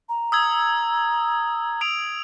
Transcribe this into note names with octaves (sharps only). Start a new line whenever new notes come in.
A#5
D#6 E6 G#6
D#6 D7 F7